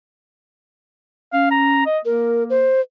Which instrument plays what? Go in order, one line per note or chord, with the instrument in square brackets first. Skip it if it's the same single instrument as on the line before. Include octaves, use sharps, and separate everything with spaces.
[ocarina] C#4 [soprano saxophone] F5
[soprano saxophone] A#5
D#5
[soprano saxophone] A#3 [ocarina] A#4
[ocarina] C5